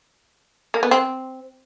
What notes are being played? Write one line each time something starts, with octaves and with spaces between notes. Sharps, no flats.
A#3
B3
C4